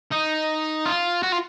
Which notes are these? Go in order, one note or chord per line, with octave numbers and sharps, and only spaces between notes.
D#4
F4
F#4
F4